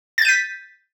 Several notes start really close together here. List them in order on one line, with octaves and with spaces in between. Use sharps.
A6 G6 D#7 B6